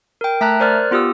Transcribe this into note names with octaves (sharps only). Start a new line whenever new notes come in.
A#4 G5
A3 E5 A5 A#5 F#6
A#4 C5 D5 F6 F#6
B3 F4 G4 D#6 E6